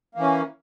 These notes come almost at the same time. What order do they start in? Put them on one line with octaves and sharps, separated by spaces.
A#3 E3 C#4